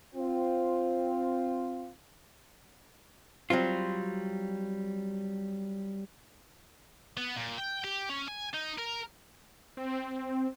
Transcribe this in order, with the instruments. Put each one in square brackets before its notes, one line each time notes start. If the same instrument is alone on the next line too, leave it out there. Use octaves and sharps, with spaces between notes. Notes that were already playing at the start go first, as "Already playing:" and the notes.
[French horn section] C4 F4
[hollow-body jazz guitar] F#3 G3 C4 F4
[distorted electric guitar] B3
A#2
G5
G4
C#4
G#5
D#4
A#4
[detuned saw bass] C4